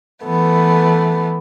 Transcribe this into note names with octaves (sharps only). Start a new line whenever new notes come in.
E3 A3 B3